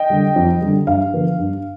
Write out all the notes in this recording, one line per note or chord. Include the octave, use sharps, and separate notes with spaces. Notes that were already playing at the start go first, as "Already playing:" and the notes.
Already playing: D#5 G5
D3 G3
F2
D3 G3
G2 F5
D3 F3 B3
G2